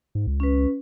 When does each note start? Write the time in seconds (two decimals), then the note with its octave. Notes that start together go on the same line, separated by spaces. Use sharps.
0.15 G#2
0.27 C#2
0.40 C#4 B4